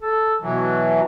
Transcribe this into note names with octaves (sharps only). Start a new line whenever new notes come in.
A4
B2 E3 F#3